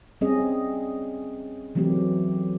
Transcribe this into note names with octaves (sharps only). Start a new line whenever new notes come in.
G3 C4 C#4 G#4 D#5
E3 F#3 A3 C4 G4